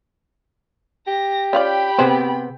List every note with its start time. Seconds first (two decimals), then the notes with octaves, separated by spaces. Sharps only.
1.07 G4 A#6
1.53 C#4 F4 D5 G5 B5
1.99 C3 B3 G#4 C5